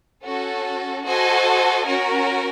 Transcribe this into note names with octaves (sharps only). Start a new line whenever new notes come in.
C#4 F#4 A4
F#4 A4 C5 D#5 G#5
C#4 F#4 A#4